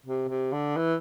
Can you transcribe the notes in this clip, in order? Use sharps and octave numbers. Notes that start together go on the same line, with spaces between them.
C3
C3
D3
E3